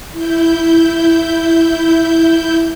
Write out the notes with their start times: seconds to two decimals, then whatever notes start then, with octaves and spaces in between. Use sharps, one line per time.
0.12 E4 G6